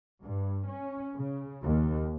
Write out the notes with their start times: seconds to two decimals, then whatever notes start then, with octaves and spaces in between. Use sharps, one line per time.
0.24 G2
0.69 C#4
1.15 C#3
1.63 D#2